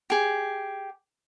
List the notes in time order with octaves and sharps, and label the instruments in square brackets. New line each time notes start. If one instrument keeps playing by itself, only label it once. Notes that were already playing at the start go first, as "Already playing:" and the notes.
[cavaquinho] G4 G#4